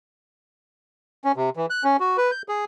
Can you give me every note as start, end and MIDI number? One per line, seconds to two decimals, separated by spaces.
1.25 1.32 61
1.36 1.50 48
1.57 1.66 52
1.70 1.84 90
1.84 1.97 61
2.00 2.17 66
2.17 2.31 71
2.31 2.42 91
2.49 2.65 68